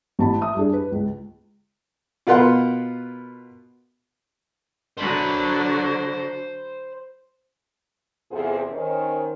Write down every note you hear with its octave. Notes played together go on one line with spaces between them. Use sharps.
A1 A5 B5
E5 D#6
G3 D4 G#4
B4
C#2
B2 F4 A#4 B4 F#5 C6
D3 F#3 D4 C5 B5
E2 C3 C4 F4 G#4 A4
D#3 C#4 C5